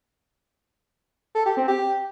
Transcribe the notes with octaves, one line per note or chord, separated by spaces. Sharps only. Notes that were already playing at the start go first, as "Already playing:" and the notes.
A4
G4
C4
G4